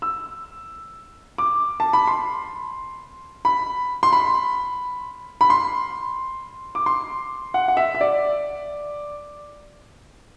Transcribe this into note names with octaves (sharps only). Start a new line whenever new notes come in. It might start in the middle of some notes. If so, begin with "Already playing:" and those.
E6
D6
A5
B5
C6
B5
C6
B5
B5
C6
D6
C6
F#5
F#5
E5
E5
D5